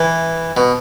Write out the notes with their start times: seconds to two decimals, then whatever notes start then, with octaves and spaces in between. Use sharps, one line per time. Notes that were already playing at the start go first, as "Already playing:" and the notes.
Already playing: E3
0.57 B2